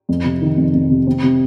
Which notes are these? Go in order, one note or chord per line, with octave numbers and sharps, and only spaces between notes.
F2
C3
D#3
F2
F2
C3
C4
C3